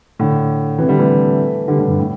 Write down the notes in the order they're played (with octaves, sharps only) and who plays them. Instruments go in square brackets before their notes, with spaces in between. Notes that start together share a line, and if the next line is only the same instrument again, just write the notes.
[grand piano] A2 D3
C3 E3
D3 G3
E3 A3
D3 G3
A2 D3
G2
A2